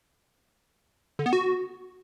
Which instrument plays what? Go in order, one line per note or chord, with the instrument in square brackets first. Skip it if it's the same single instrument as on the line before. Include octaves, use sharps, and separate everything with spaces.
[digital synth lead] D3
B3
F#4